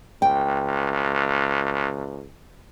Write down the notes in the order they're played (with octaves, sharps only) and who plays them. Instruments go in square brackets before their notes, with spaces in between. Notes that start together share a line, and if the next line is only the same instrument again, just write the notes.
[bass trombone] C#2 [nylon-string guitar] G5